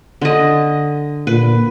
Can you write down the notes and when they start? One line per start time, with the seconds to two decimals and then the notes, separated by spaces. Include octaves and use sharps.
0.21 D3 D#5
1.27 A#2 B4